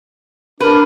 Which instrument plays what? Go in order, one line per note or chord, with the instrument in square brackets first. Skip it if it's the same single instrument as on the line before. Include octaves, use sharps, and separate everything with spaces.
[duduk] D4 [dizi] A#4 [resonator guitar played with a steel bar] B4